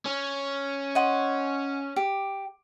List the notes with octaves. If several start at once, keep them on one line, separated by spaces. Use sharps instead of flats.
C#4
D#5 F#5 C6
G4